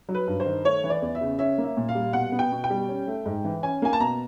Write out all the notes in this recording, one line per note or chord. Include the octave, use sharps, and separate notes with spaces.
F#3
B4
G2
C5
D#3
A3 C#5
E3
D5
E2
E5
C#3
C#4 E5
A#3
E5
A#2
F5
G3
B2 F#5
B3
G5
B2
G5
G3
C#4
A3
G#2
E3
C#4 G#5
A#3 G#5
A5
B2 A#5